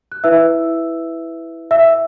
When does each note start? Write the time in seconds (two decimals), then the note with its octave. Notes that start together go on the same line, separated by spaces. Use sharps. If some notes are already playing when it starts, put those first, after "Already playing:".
0.12 F#6
0.24 E4 B4 E5 E6
1.71 E5 E6